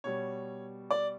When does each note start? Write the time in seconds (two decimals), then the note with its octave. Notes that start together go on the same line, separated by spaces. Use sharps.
0.04 B2 G3 C#5
0.91 D5